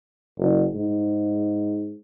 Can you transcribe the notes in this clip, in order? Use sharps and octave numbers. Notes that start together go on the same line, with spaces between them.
F#1
G#2